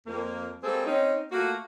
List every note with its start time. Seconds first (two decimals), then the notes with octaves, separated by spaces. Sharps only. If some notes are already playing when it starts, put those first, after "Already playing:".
0.06 F2 A#3
0.64 G3 G#3 A#3 C4 G#4 A4
0.85 C4 C#4 D#4
1.32 A3 A#3 F4 F#4